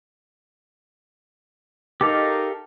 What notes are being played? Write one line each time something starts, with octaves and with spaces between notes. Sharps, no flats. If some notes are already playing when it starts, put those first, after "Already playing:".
D#4 G4 A4 A#4 F5 D6